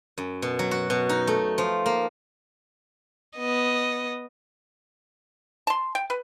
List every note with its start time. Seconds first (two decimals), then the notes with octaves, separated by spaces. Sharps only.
0.18 F#2
0.42 B2
0.59 F#3
0.71 F#4
0.90 B2
1.09 D#4
1.27 A3
1.58 F3
1.86 A#3
3.38 B3 D#5
5.67 A5 C6
5.95 G5
6.10 B4